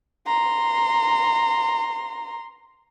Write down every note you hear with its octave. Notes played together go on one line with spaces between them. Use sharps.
A#5 C6